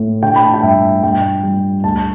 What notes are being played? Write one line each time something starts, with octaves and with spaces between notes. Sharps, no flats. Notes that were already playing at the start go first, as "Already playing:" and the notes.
Already playing: A2
D3 G5
B5
A5
G5
G2 E5
G2 G5
G3
D2 A5